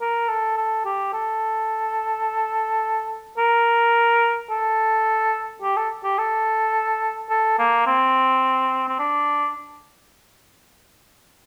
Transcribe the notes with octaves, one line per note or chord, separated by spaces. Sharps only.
A#4
A4
A4
G4
A4
A#4
A4
G4
A4
G4
A4
A4
A#3
C4
C4
D4